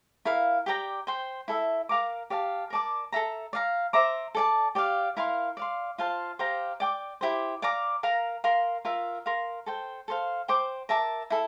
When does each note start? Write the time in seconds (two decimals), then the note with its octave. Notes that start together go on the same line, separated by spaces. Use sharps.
0.25 E4 A#4 F5
0.66 G4 D5 G5 A#5
1.07 C5 G5 C6
1.48 E4 A4 E5
1.89 A#4 F5 A#5 D6
2.30 G4 D5 F5 A5
2.70 A#4 D5 A5 D6
3.12 A4 E5 A#5
3.53 D5 F5 A#5
3.93 C5 E5 A#5 D6
4.35 A4 D5 A5
4.75 G4 D5 F5
5.17 E4 A#4 F5 C6
5.57 D5 F5 C6
5.98 F4 C5 F5 A5
6.39 G4 C5 F5 A#5
6.80 D5 G5 D6
7.21 E4 G4 C5
7.62 D5 F5 A#5 D6
8.03 A#4 F5 A#5
8.44 A#4 F5 C6
8.85 F4 A#4 E5
9.26 A#4 F5 C6
9.66 A4 C5 G5
10.08 A4 C5 F5
10.48 C5 G5 D6
10.89 A#4 E5 A5 D6
11.30 E4 A4